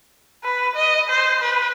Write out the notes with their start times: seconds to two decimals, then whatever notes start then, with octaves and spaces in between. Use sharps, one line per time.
0.44 B4
0.76 D#5
1.09 C5
1.42 B4